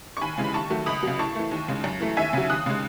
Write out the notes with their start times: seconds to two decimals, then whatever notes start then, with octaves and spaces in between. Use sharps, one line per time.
0.17 C#6
0.21 D#2 G#5 B5
0.38 C#3 E3 G#3
0.44 B5
0.54 D#2 A5 C#6
0.70 D#3 F#3 A3
0.86 C#2 B5 D#6
1.03 C#3 F#3
1.19 A2 A5 C#6
1.35 E3 A3
1.51 D#2
1.68 C#3 G#3
1.84 F#2
2.00 E3 A3
2.17 D#2 E5 G#5
2.33 C#3 F#3
2.49 D#2 D#6 F#6
2.66 C#3 G#3